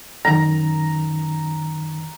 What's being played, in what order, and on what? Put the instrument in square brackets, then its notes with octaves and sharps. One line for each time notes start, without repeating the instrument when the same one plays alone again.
[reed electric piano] F#2 D#3 [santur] A#5